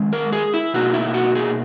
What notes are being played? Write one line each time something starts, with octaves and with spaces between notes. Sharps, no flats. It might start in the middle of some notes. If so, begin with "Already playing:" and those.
Already playing: D#3 G#3 C#4
A#4
G#4
E4
B2 A#3 D#4 F#4
E4
F#4
G#4